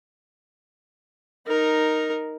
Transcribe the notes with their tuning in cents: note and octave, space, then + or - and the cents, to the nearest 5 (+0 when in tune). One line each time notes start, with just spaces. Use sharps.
D#4 +0 A#4 +0